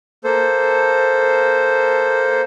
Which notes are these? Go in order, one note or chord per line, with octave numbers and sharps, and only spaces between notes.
A#3 A4 C5